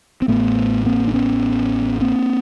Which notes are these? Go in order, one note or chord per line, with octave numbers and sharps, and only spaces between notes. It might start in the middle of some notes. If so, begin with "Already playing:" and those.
C4
A1 A2 A3 B3
A#3 C4
D4
B3 C#4
A#3 C4